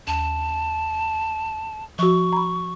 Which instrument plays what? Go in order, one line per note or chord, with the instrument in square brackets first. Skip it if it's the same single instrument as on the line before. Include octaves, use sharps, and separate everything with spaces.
[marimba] D#2 [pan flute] A5
[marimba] F3 F#4 [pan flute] C#6
[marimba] A#5 B5